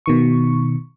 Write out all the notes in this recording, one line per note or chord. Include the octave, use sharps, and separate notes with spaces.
B2 D#3 C#6